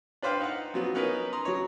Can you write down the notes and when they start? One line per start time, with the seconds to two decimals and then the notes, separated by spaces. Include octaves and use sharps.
0.22 D4 B4 C5 F5 G5
0.41 D#4 F#5
0.74 F3 F#3 B3
0.94 B3 C#4 D#4 A#4 B4
1.33 A#5 C6 D#6
1.45 F#3 C#5